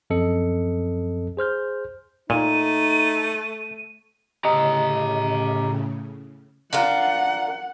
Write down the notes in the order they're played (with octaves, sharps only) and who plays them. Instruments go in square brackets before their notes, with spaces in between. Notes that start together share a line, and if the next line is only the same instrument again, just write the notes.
[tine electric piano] F#2 F3 C4 A4 D#5 C#7
G#4 C5 F6 G6
[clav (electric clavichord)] A#2 [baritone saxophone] A3 [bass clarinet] D#4 [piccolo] D#7
[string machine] A2 C#3 [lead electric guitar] G4 A#5 [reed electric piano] D#5
[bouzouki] D4 F4 A#4 [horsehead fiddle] F#5